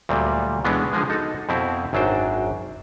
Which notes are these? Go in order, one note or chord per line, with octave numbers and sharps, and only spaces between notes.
D2 A#2 F#3 G3
B2 E3 G#3 B3 C#4 D4
D3 F3 G#3 G#4
D#4 F#4 A4
F2 B2 C4 E4
G#1 F#2 F#3 D4 C5 G5